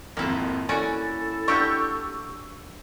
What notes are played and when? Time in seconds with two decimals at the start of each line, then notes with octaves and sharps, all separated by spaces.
0.17 G#1 F2 A#3 E4
0.69 C#4 E4 F#4 A4 D5 G#5
1.48 D4 F#4 G4 C#6 E6 G6